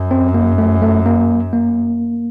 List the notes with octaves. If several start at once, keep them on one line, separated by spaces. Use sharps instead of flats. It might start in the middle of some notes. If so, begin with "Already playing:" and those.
Already playing: F#2
C4
A#3
A3
A3
A#3
A#3